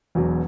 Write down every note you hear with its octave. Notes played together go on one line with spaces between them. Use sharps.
E1 E2 B2 F#3